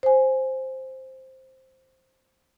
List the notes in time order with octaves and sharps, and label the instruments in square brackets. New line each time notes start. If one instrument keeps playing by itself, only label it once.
[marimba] C5 G#5